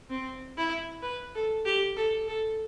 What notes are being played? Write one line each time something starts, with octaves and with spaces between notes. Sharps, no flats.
C4
E4
B4
A4
G4
A4
A4